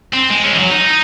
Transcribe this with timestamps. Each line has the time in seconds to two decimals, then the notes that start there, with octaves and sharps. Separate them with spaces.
0.14 C4
0.30 G#3
0.44 G#3 C#4
0.55 E3 F#3
0.71 D#4
0.87 D#4